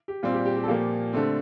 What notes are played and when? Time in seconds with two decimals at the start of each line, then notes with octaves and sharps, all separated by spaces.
0.08 G4
0.23 A#2 G3 C4 F4
0.33 G4
0.46 G4
0.57 G4
0.64 A4
0.68 A#2 F3 A#3 G4
1.13 D3 A3 C4